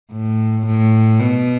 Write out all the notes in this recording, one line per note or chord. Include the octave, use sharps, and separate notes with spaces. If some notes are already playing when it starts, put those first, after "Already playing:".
A2
A2
B2